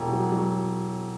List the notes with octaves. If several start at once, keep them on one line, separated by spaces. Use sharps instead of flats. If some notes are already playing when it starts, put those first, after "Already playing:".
Already playing: E1
F#3
F#3